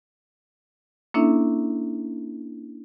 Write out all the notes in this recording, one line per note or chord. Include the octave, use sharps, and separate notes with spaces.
A#3 C#4 D4 E4 A4 E5